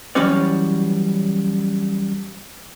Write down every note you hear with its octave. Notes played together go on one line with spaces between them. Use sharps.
E3 F#3 G3 C#4 C#5 D5